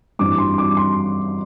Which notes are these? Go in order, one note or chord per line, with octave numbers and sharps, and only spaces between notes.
G2 E3 G3 C4 D6
C6
D6
C6